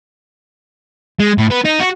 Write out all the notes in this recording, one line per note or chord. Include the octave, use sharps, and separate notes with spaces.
G#3
A2
B3
D#4
F#4